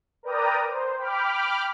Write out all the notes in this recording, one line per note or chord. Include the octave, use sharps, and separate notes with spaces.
A#4 B4 D5 G5 A#5 D#6
C5
G5 B5 D6 F6